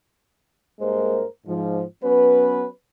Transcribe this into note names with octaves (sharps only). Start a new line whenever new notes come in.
G2 G#3 A#3 A#4 C5
G#2 F3
F#3 B3 C#4 B4